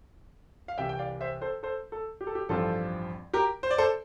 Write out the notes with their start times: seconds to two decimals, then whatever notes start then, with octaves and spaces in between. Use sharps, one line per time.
0.68 F5
0.77 C2 C3 E3 E5 G5
0.89 G5
0.99 D5 F5
1.21 C5 E5
1.42 A4 C5
1.63 A4 C5
1.92 A4
2.21 G4
2.27 A4
2.35 G4
2.49 A1 G2 F3 C4 F4 A4
3.34 G4 A#4
3.63 C5
3.71 D5
3.78 A4 C5